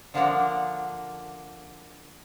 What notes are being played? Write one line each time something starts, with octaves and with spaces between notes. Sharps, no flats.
D3 F3 A#3 D4 A#4 F#5